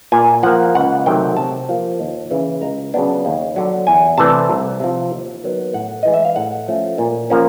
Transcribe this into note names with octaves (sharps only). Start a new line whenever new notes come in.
A#2 G#5
F3 A#3 F#5
C#2 F#5
C3 D#3 F#3 A3 G5
C3 A5
F3 A#3
D#2
C#3 E3
C#2 A#5
C#3 F#3 B3 D4
D#2
D3 F#3
E2 G#5
C3 E3 A3 D4 A5
C2
C3 F3
D#2
D#3 F#3 B3
A2 F#5
E3 G#3 D#5
E5
F5
A2 F#5
F3 A3 C#4
A#2
F3 A#3 C#4